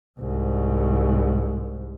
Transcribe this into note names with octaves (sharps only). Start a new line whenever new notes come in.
C2 G#2